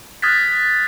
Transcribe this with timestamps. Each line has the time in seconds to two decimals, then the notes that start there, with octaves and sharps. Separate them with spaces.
0.22 D#6 F6 F#6 G#6 A6 B6